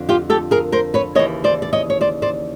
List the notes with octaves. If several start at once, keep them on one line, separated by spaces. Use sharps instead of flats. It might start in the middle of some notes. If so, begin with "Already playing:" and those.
Already playing: F2 D3
F4 G4
G4 A4
G#4 A#4
A#4 C5
B4 C#5
D#2 C#3 E3 C#5 D#5
C5 D5
D5
C#5 D#5
C#5
C5 D5
C5 D5